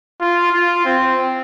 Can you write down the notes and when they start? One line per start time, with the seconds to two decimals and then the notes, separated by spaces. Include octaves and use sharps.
0.21 F4
0.52 F4
0.86 C4